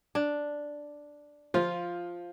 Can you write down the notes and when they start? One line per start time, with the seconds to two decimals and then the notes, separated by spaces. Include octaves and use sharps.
0.15 D4
1.54 F3 F4